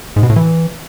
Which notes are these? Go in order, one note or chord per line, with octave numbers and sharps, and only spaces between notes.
G#2
B2
A2
E3